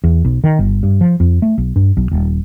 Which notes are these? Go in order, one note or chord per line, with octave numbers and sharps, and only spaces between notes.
E2
B1
D#3
G1
G2
F3
F2
A3
B1
G2
B1
D#1